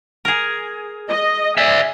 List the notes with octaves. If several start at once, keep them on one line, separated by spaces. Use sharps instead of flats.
G#4 A#4
D#5
D5 E5 G#5